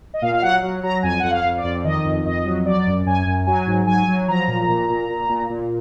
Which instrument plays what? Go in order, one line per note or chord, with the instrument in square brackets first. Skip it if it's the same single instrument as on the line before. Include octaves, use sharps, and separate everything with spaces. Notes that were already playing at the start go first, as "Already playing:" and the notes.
[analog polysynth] D#5
A#2 F5
F5
F#3 F#5
F#3
F#3 A#5
F2 G#5
F2 F#5
F5
F2
D5
F2
D#3 D#5
F2
F2 D#5
F#3
F#3 D5
F#2
F#2 G#5
F#2
F#3 G#5
G#2
F#3 G#5
F#3
F3 A#5
A#2
A#2
A#2
A#2
A#2
A#2